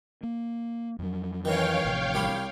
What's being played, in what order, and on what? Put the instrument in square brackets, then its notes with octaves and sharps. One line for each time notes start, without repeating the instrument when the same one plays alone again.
[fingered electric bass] A#3
F2 F#3
[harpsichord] D#3 E3 C#4 [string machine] C#5 F5 G5
[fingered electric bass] A1 C3 F3
[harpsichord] C2 G4 B5